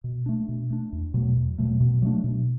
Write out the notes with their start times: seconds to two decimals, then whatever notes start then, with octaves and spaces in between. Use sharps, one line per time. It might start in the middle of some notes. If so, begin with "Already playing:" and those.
0.04 B2
0.26 A3 D4
0.49 B2
0.70 A3 D4
0.93 E2
1.14 B2 F#3 A3
1.37 E2
1.58 B2 F#3 A3
1.80 B2
2.02 F#3 A3 D4
2.24 B2